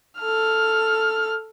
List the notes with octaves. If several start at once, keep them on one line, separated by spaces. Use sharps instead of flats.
A4 F6